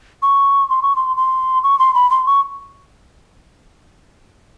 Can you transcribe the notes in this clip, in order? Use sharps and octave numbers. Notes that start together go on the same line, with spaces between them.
C#6
C6
C#6
C6
C6
C#6
C6
B5
C6
C#6